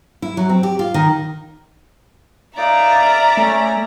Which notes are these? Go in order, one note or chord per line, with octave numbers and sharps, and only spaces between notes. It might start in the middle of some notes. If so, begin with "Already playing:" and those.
E4
F#3
C4
G4
F4
D#3
A#3 D#4 D5 E5 A#5
A#4
A3 C#4